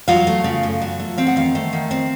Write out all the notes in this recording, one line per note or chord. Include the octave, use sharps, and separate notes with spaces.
F#3 F4 F5
A3
C#3
F#2
F#3
A3
C4 F5
F#5
D#3 F4 F5
A3
D#3
C4